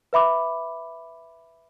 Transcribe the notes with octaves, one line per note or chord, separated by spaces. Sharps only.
B4 E5 B5 D6